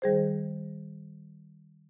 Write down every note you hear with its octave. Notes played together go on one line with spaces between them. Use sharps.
D#3 G3 G#4 C5